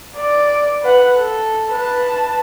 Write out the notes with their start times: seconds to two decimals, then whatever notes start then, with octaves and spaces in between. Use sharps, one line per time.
0.16 D5
0.83 B4 F#5
1.17 A4
1.71 B4 A5